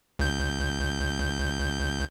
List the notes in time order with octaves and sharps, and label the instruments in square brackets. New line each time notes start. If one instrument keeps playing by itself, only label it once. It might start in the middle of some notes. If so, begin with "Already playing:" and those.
[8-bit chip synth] C#2 G6